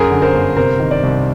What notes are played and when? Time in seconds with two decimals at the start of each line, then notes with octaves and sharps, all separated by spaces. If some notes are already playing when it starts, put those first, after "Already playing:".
Already playing: F#2 G#4 A#4
0.11 D3
0.22 A#4 C5
0.34 G1
0.57 C3 A#4 C5
0.80 D#3
0.91 C5 D5
1.03 C2